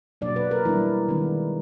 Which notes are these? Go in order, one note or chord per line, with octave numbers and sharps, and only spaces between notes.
B2 F#3 A#3 D4 D5
B4
A#4
E3 G3 B3 D4 E4
D#3 G#3 B3 D4